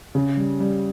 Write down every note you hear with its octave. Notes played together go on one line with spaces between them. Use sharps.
C#3
G3
G3